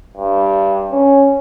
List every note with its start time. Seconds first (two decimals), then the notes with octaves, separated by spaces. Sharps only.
0.17 G2
0.91 C#4